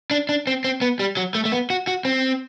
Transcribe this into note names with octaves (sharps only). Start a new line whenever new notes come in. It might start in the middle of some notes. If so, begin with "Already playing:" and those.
D4
D4
C4
C4
B3
G3
F#3
A3
A3
B3
F#4
F#4
C4